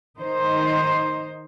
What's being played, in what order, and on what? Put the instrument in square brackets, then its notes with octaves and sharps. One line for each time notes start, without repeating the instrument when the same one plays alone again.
[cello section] D#3 D#4 C5